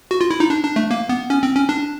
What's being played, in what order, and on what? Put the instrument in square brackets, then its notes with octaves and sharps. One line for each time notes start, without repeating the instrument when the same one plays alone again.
[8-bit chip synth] F#4
F4
E4
D#4
D4
D4
A3
A#3
B3
C#4
C4
C#4
D4